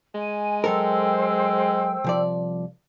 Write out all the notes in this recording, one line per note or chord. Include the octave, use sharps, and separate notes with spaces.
G#3 G#5
F#3 A4 A#4 C5 G5 E6
C2 F3 D5